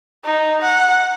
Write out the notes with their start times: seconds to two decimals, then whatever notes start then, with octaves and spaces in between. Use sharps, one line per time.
0.24 D#4
0.62 F#5